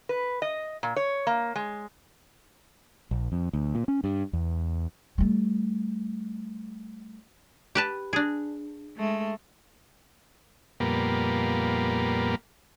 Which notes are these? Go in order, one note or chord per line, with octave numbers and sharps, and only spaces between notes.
B4
D#5
A#2
C#5
A#3
G#3
A#1
F2
D2
A#2
C#4
G2
E2
G3 A3
G4 B4 A5
D4 G#4
G#3 A3
F2 A#2 G3 A#3 B3